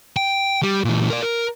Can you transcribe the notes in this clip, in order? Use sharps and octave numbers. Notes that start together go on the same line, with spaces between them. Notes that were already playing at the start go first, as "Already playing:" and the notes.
G5
G3
A#2 E3
A#4 D5
A#4